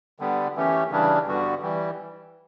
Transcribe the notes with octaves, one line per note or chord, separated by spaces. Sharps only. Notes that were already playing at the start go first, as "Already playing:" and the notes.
D3 G3 B3
F#2 E3 A3 C#4 G4
C#3 E3 G3 D4
G2 D3 G3 B3 F#4
E3 G3